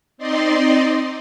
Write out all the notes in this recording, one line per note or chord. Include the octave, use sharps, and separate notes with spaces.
C4 D#4 D5 D#5 C6